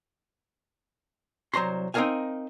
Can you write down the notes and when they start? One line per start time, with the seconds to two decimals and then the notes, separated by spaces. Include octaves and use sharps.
1.54 C2 F#3 C5 A#5 C6
1.94 C4 D#4 A4 A#4 F5 G#5